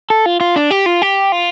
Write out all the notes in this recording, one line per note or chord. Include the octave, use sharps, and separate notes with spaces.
A4
F4
F4
D4
G4
F4
G4
F4